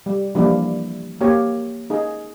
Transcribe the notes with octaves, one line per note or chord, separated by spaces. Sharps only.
G3
E3 F3 G3 A#3 D4 E4
A#3 G4 C#5
D#4 G#4